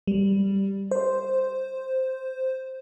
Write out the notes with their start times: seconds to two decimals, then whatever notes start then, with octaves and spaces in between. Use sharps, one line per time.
0.07 G3
0.91 C5